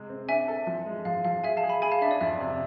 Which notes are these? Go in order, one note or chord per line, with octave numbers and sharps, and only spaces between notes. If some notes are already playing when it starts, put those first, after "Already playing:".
Already playing: C3 G#3
C4
D4 E5 G#5
A4
F3
G#3
F3 F5
F3 F5
G#4 E5 G#5
F5 A5
G#4
G#5 B5
G#4 G#5 B5
F5 A5
D4 E5
D5
F2 E5
C3